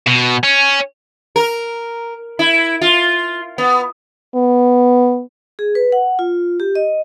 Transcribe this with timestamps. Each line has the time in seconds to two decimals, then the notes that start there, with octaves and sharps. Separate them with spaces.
0.07 B2
0.44 C#4
1.36 A#4
2.39 E4
2.81 F4
3.58 B3
4.35 B3
5.59 G#4
5.75 B4
5.92 F#5
6.19 F4
6.60 G4
6.75 D#5